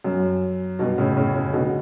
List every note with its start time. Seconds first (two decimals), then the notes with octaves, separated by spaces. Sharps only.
0.04 F#2
0.79 G2 B2
0.98 A2 C#3
1.17 A2 C#3
1.35 A2 C#3
1.53 B2 D3